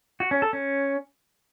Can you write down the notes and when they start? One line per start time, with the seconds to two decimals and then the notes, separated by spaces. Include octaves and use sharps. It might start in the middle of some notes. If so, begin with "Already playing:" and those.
0.20 F#4
0.31 C#4
0.42 A4
0.53 C#4